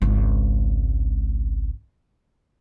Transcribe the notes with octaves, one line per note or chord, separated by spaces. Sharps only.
G#1 C#2